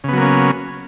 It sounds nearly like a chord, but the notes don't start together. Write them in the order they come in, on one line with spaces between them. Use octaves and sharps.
C#3 B3 F#3 A#3 C#4